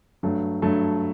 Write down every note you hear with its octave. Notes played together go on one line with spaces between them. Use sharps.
G2 F#3 A3
G2 F#3 A3